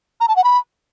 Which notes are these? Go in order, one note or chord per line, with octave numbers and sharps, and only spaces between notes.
A#5
A5
F#5
B5